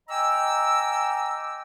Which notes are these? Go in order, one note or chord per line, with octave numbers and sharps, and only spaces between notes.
D#5 G5 G#5 A#5 D6 E6